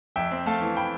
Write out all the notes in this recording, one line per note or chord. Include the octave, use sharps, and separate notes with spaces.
F2 E5 G5
C4
A3 F5 A5
E3
G5 B5